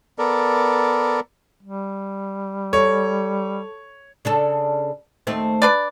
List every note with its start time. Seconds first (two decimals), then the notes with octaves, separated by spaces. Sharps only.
0.18 B3 A4 A#4 D5
1.63 G3
2.73 A4 C#5
4.25 C#3 D4 A4
5.27 D#2 A3 C4
5.62 D4 B4 D5